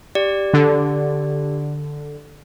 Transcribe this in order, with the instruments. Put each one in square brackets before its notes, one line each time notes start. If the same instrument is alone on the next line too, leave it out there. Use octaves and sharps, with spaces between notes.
[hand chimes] G4 D5
[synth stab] D3